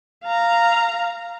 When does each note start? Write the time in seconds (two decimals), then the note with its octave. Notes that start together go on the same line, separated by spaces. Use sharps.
0.24 F5 A#5